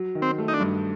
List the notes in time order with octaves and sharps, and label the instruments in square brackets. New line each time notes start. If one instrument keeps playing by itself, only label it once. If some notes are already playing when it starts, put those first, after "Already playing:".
Already playing: [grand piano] F#3
D#3
[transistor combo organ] C4
[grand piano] A3
[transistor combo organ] D#4
D4
[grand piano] G2